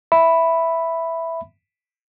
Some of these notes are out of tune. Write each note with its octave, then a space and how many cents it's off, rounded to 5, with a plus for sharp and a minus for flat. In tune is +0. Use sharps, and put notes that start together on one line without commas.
E5 +0 B5 +0